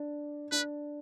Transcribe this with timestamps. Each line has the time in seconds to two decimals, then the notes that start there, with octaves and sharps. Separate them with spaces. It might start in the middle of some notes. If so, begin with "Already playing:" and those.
Already playing: D4
0.52 D4 B4